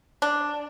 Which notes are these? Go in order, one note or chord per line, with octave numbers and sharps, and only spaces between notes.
D4